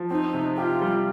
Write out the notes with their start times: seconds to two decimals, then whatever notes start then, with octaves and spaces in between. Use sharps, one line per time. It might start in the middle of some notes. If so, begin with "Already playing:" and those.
Already playing: F3
0.11 C4 D#4
0.34 C3
0.58 F4 G4
0.81 G3